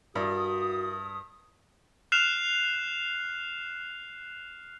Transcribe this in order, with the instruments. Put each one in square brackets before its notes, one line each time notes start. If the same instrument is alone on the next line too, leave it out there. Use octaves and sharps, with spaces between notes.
[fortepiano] G2 [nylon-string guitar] E4 A#4 D5 [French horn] F#4 [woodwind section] D#6
[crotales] F6 F#6 C7 E7 F7